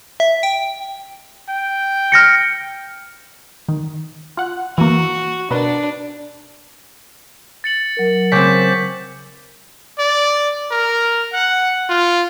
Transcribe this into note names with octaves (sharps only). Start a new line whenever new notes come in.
E5
G5
G5
F6 A#6 C#7
D#3
F4 F#5
E3 A#3 F#4
B2 D4 A#4 B4
A6 C#7 F#7
F#3 A#4
C#3 C4 D6 G6 B6
D5
A#4
F#5
F4